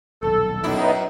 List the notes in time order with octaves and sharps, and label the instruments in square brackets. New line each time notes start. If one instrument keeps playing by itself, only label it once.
[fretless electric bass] D#1 B1 [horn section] A4
[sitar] F#2 E4 [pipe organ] B3 D#4